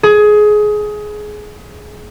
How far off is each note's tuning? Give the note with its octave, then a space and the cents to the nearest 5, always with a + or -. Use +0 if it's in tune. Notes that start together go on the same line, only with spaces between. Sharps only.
G#4 +20